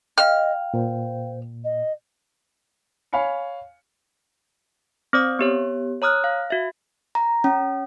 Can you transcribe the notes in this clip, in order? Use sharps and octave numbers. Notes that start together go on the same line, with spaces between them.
D#5 F5 G5 F6
A#2 C5
D#5
C#5 F5 G#5 B5 C#7
C4 C5 D5 D#6
B3 G4 C#5
C#5 A#5 D#6 F6 F#6
F5
F#4 E5
A#5
C#4